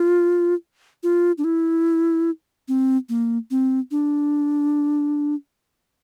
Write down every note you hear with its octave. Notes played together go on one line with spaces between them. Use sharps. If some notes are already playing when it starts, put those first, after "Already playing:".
Already playing: F4
F4
D4
E4
C4
A#3
C4
D4